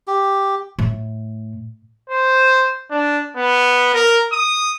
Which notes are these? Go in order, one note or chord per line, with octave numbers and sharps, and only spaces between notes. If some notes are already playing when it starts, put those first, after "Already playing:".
G4
A2
C5
D4
B3
A#4
D#6